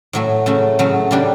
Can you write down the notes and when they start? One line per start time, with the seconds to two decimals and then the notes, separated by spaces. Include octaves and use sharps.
0.13 A2 F#3 A3
0.46 C#3 F#3 A3
0.79 C#3 F#3 A3
1.11 C#3 G3 D4 G4